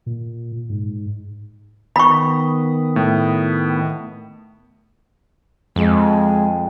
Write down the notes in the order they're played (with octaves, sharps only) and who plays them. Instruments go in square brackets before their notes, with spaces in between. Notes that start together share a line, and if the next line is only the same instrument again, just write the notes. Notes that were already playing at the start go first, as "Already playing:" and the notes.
[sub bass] A#2
G#2
[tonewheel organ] D#3 B3 [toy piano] B5 C#6
[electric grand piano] A2
[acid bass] F2 [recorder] G#3